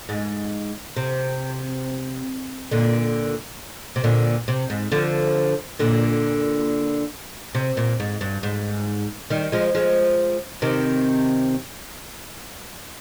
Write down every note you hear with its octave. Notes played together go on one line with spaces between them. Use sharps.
G#2
C3
A#2 D3
C3
A#2 D3
C3
G#2
D3 F3
A#2 D3
C3
A#2
G#2
G2
G#2
D#3 G3
F3 G#3
F3 G#3
C3 D#3